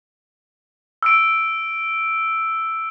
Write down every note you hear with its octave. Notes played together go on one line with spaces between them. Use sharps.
E6 D7